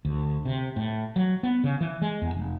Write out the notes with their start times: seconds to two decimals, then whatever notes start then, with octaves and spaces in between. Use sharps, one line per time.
0.05 D2
0.45 C3
0.76 A2
1.16 F#3
1.43 B3
1.64 C#3
1.81 E3
2.02 G#3
2.22 E2
2.34 F1